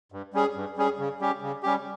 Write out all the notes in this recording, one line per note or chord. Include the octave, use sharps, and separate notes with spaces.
G2
G3 C#4 G#4
G2
G3 C#4 G#4
C#3
G3 C#4 G4
C#3
G3 C#4 G4